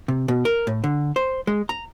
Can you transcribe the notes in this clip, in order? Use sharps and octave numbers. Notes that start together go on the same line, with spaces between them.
C3
B2
A#4
A2
D3
C5
G#3
A#5